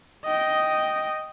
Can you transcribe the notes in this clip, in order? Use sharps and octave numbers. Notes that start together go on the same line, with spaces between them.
D#5 G5